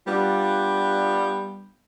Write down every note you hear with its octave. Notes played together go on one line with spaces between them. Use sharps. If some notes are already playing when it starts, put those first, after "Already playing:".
G3 B3 D4 F4